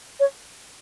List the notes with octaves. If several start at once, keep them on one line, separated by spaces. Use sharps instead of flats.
C#5